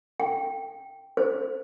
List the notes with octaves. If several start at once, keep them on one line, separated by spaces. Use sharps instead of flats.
G5
C5